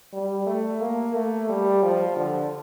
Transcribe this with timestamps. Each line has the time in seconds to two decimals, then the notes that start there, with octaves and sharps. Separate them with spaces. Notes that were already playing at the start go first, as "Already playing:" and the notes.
0.13 G3
0.47 A3
0.81 A#3
1.14 A3
1.49 G3
1.83 F3
2.17 D3